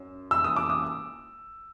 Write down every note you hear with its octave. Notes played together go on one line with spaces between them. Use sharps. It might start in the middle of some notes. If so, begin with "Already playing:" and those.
Already playing: F#2
E6
D#6
D6
D#6